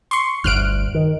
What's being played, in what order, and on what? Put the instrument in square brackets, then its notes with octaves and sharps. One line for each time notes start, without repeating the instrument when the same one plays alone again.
[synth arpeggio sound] C6 C#6
[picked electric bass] G1 D2 [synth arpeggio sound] F6 F#6 D7
[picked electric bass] D#3